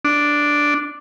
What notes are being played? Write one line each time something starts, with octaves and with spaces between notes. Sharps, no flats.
D4